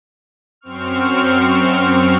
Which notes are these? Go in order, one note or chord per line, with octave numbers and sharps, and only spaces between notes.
F#2 C4 C#6 F6